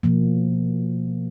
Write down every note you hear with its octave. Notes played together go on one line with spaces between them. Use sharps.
B2 F3 A#3